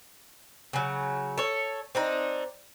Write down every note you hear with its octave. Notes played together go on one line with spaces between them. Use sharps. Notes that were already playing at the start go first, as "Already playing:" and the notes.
C#3 F#3
A4 C#5
C4 D4 D#4